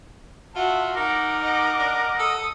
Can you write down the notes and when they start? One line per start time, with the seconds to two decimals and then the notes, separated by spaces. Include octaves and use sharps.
0.56 F4 F#4 E5 A5
0.97 D#4 A#4 F#5 D6
1.42 D#5 F#5 D6
1.79 D4
2.19 A4 D#6